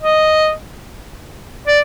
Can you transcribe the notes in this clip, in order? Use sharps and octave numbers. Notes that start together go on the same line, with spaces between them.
D#5
D5